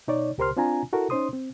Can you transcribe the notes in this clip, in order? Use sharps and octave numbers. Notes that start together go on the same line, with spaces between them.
B2 D#4 C#5 D5
C#2 G4 A#4 C5 C6 F6
C4 D4 F4 G#5 A#5
E4 F#4 A4 A#4
C#4 D#4 C5 C6 D#6
C4